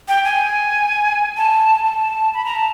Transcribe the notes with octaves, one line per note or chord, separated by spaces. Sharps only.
G5
G#5
A5
A5
B5
A#5
A5